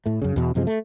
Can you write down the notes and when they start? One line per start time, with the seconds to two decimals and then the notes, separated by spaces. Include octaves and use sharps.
0.06 A2 A3
0.22 F#2 C#3
0.36 E2 B2
0.55 F#2 C3 F3 G#3
0.67 A3